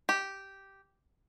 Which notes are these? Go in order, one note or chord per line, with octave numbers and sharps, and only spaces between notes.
G4